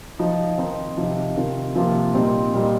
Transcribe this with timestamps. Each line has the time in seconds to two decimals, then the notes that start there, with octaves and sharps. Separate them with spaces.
0.19 F3 D#4
0.58 D#3 C4 D#4
0.97 C3 F3 D#4
1.36 C3 D#3 C4 F4
1.75 C3 F3 A#3 F4
2.14 A#2 G3 C4 D#4
2.53 A#2 G3 D#4